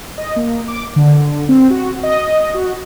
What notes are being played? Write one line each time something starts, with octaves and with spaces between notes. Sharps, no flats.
D#5
A#3
D6
D3
C4
F#4
D#5
F#4